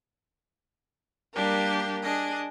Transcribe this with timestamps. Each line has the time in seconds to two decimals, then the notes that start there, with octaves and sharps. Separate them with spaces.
1.34 G3 A#3 D4 G4 A#4
2.03 D4 G#4 D#5